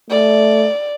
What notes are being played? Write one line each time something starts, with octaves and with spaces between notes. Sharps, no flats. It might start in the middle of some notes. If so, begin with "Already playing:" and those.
A3 D5